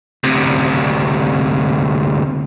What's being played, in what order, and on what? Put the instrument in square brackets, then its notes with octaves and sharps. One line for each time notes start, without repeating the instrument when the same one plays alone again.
[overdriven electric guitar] D2 C3